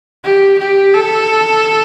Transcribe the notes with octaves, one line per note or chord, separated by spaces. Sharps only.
G4
G4
A4